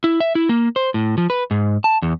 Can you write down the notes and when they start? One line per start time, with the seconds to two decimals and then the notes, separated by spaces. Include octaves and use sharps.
0.04 E4
0.20 E5
0.35 E4
0.49 A#3
0.76 C5
0.94 A2
1.18 F3
1.30 B4
1.51 G#2
1.84 A5
2.02 E2